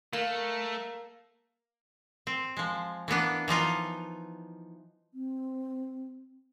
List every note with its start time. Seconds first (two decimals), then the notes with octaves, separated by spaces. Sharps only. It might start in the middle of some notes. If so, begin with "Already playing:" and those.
0.13 A3 A#3
2.27 C4
2.57 F3 G#3
3.08 E3 A#3 B3 D4
3.48 E3 F3 D#4 F4
5.13 C4